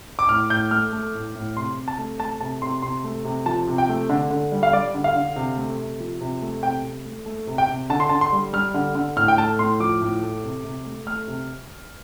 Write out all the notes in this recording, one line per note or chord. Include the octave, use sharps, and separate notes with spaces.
D6
A2 F6
A2 G6
A3 F6
A3
A2
A2
C3 C6
C3
A5
A3
A3 A5
C3 A5
C3 C6
C3 C6
A3
C3
F3 A5
C3
G5
A3
D3
D3
G3
F5
G3 D5
D3
F5
D3
C3
A3
C3
F3
C3
A3
C3 G5
C3
A3
A3
C3
G5
C3
D3 A5
C6
D3 A5
C6
G3
G3 F6
D3
D3
A2 F6
G5
A3 A5
A2 C6
F3 D6
A2
A3
C3
C3
A3
A3 F6
C3